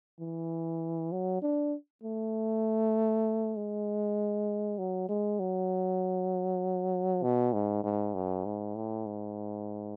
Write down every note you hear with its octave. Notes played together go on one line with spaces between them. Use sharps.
E3
F#3
D4
A3
G#3
F#3
G#3
F#3
B2
G#2
G#2
F#2
G#2
A2
G#2